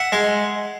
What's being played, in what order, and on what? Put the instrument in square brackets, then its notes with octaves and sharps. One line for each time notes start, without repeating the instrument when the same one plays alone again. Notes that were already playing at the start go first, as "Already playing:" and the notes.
Already playing: [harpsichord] E5 F#5
G#3